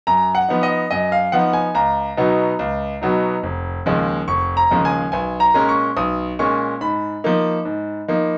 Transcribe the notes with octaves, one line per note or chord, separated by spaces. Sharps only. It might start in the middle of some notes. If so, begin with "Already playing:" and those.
F#2 A#5
F#5
F3 B3 D#4
D#5
F#2 D#5
F5
F3 B3 D#4 F#5
G#5
C#2 A#5
B2 F#3 B3 D#4
C#2
B2 F#3 B3 D#4
F1
D#2 C#3 F3 G#3
F1 C#6
A#5
D#2 C#3 F3 G#3
G#5
B1 G#5
A#5
A#2 G#3 C#4
C#6
B1 D#6
A#2 G#3 C#4 C#6
G#2 B5
F3 A#3 D#4
G#2
F3 A#3 D#4